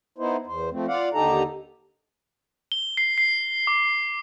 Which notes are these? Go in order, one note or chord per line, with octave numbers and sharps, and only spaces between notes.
B3 D#4 E4 C5
E2 C5
F3 A3 C4
F4 D5 F5 F#5
D#2 D3 D#4 G4 A4 A#5
G7
C7
C7
D6